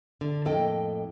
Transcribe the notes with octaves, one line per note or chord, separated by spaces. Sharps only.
D3
F2 A2 A#3 A4 D#5 G5